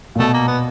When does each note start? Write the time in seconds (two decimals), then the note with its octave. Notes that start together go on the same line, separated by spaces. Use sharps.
0.15 A#2
0.19 B2 A3
0.34 A#3
0.48 B3